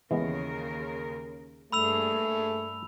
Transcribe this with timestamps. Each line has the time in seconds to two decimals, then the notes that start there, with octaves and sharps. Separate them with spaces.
0.11 D#2 C#3 E3 G#3 B3 A#4
1.72 G2 A3 A#3 G#4 B5 E6 F7